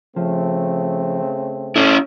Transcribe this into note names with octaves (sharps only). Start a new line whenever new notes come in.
C#3 F3 A3 C4
C#4 E4 A4